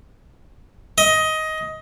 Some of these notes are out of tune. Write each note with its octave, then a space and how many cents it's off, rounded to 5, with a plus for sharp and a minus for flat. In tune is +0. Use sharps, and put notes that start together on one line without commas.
D#5 +15